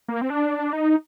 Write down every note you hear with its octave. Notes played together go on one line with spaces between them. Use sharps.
A#3
C4
D4
D#4